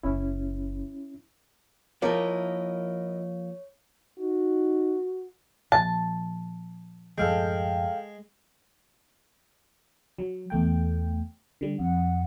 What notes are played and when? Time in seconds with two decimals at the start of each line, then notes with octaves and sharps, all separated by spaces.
0.03 F#1 C#4 E4
2.02 F3 A#3 E4 G4 A#4 C#5 D#5
4.19 D#4 F#4
5.72 A#2 F3 A5
7.18 F#2 A2 F3 G#3 A4 F5 G5
10.18 F#3
10.50 E2 A3 G5
11.61 D3 G3
11.79 F2 F#5